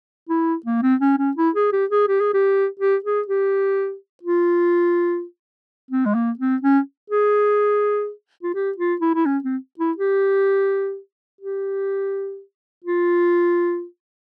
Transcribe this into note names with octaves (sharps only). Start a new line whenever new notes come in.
E4
A#3
C4
C#4
C#4
E4
G#4
G4
G#4
G4
G#4
G4
G4
G#4
G4
F4
C4
G#3
A#3
C4
C#4
G#4
F4
G4
F4
E4
E4
C#4
C4
E4
G4
G4
F4